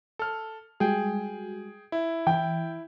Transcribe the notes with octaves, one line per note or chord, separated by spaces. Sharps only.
A4 F6
G3 G#3 F#4 G#4 G5
E4
E3 G5